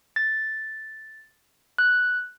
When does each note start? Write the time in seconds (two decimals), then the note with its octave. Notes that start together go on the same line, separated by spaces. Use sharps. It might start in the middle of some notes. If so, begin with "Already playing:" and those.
0.16 A6
1.78 F#6